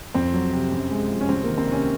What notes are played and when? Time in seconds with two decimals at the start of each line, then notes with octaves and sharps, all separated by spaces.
0.15 F2 C4
0.34 F#3
0.53 C3
0.72 F#2
0.91 G#3
1.10 F3
1.21 C#4
1.29 C2 C4
1.44 D#3 A#3
1.58 C4
1.67 C3 C#4